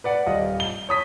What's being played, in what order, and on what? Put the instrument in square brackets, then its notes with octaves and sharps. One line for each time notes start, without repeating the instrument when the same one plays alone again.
[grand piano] B4 D5 F#5
D#1 F4 D#5
G7
C#5 D#6 B6